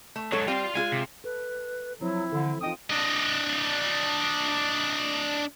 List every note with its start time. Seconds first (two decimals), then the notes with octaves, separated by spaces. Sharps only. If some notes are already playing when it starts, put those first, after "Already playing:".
0.16 A3
0.32 G#2 F#3 A4 C#5
0.48 G3 C4 F4 C6
0.75 G#3 F4 G#4 G#5
0.92 C3
1.24 A4 B4
2.01 F3 F#3 C4 E4 C5
2.32 D3 E3 A4
2.62 C4 D#4 F4 D#5 G5 D#6
2.90 D4 D#5